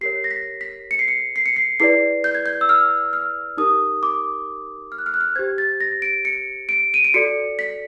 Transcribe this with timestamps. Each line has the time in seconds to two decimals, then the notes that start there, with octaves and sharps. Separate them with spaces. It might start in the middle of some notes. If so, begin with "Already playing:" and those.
0.01 G4 A#4 C#5 C7
0.24 A#6
0.31 B6
0.61 B6
0.91 C#7
0.99 C7
1.08 C#7
1.36 C7
1.46 C#7
1.56 C7
1.80 E4 G#4 B4 D5 C7
2.24 G6
2.35 G#6
2.46 G6
2.61 E6
2.69 F6
3.13 F6
3.57 D#4 G4 A#4 D#6
4.03 D6
4.92 F6
4.98 F#6
5.06 F6
5.14 F#6
5.21 F6
5.36 G4 C5 G#6
5.58 A6
5.81 A#6
6.02 D7
6.25 C#7
6.69 D7
6.94 D#7
7.04 D7
7.14 F#4 A4 D5 C#7
7.59 B6